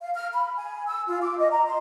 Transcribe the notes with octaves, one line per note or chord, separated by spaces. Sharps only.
F5
F6
B5
G#5
E6
F4
D6
D#5
A#5
C6